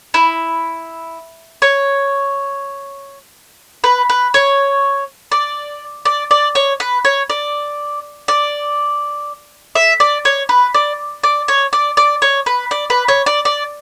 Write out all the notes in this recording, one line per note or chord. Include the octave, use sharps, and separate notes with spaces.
E4
C#5
B4
B4
C#5
D5
D5
D5
C#5
B4
C#5
D5
D5
E5
D5
C#5
B4
D5
D5
C#5
D5
D5
C#5
B4
D5
B4
C#5
D5
D5